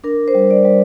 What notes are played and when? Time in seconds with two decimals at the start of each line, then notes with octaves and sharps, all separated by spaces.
0.04 D4 A#4
0.28 C5
0.35 G3
0.51 D5
0.65 G3